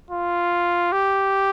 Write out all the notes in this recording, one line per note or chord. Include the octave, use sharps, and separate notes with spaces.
F4
G4